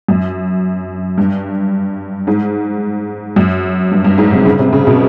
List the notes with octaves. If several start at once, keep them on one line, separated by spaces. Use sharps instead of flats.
F#2
G2
G#2
F#2
G2
G2
G#2
C3
C#3
C3
C#3
B2